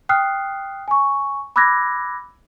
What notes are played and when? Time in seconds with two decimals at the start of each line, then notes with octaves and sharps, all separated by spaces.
0.09 G5 D#6 F6 F#6 C7
0.88 G#5 C#6
1.56 B5 D6 E6 F#6 G#6 A#6